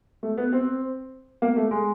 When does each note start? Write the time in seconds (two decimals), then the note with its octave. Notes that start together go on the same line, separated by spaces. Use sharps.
0.23 A3
0.38 B3
0.53 C4
1.42 A#3
1.56 A3
1.71 G#3